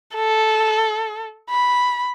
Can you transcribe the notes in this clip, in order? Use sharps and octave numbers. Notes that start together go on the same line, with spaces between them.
A4
B5